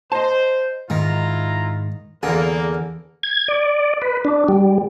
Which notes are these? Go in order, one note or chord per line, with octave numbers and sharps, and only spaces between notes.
C5 D#5 A5
G#2 D#3 E4 F4 A#5
E2 D3 A#3 G#4 A#4
G#6
D5
B4
D4
G3